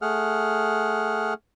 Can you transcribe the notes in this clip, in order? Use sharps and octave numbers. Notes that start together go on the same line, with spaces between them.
A3 G#4 F#5 F6